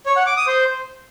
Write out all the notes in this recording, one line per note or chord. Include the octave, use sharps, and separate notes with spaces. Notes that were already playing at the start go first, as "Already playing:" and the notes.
C#5
F#5
D6
D#6
C5